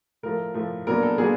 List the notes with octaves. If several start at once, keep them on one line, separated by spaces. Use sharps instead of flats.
A2 F3 A3 A#4
A2 F3 A3
A#2 F#3 B3 D4 A#4
A4
A#2 F#3 B3 D4 G#4